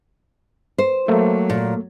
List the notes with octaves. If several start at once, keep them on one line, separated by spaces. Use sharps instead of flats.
C5
F#3 A3 A#3
A#2